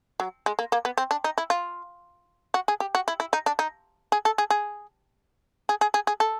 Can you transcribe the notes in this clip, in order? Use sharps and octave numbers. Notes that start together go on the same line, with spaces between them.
F#3
G#3
A#3
A#3
B3
C4
D4
D#4
E4
F4
F#4
G#4
G4
F#4
E4
E4
D#4
D4
D#4
G#4
A4
G#4
G#4
G#4
G#4
G#4
G#4
A4